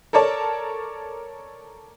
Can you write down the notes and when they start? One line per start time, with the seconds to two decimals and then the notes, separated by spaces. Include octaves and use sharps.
0.13 A4 A#4 C#5 D5 A5